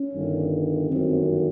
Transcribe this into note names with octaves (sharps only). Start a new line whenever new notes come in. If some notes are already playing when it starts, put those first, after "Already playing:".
Already playing: C#4
G1 G2 D#3
G1 F#2 D#3 C4